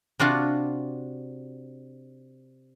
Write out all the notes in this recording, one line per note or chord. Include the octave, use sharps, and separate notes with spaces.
C3 D4 F4 F#4